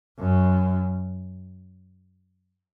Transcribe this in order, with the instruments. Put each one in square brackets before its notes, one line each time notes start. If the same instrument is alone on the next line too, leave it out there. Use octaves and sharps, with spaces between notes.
[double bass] F#2